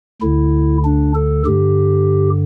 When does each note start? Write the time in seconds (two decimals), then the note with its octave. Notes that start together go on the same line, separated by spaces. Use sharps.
0.22 D2 D3 E4
0.84 D4
1.15 A4
1.46 G2 D3 G4